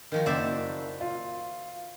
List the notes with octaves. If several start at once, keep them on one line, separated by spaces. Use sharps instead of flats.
D#3 F3 F#4
F#1 C5 D5 E5
F4